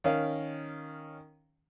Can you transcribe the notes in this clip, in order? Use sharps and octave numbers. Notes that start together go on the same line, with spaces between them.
D#3 C#4 F5